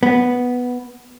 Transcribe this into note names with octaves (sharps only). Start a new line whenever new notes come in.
B3